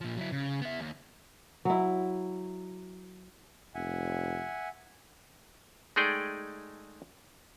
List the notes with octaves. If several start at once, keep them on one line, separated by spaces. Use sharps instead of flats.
A#2 F3
F#3 E4
C#3
B3 E5
D#2
F#3 E4
F1 E5 F#5 G#5
G#3 A3 D#4 G#4 D5 G5